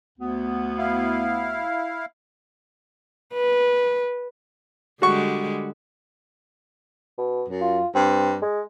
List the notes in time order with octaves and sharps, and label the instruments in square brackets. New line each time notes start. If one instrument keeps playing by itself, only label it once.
[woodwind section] D2 B3
[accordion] E4 F5
[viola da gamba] B4
[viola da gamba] D3 G3 G#3 [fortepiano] F#4 C#6
[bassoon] B2
[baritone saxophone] F#2
[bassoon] F4
[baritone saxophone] G2 [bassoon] C4
[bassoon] G#3